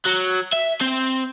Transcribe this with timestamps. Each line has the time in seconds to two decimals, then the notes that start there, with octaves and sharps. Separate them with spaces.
0.06 F#3
0.53 E5
0.81 C4